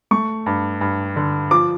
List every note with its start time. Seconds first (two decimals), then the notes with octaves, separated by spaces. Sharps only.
0.11 A3 C#6
0.46 G2
0.81 G2
1.16 D3
1.51 F3 D6